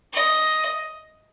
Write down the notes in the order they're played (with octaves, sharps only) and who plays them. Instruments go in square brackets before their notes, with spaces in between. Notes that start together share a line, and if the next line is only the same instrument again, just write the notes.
[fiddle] D#5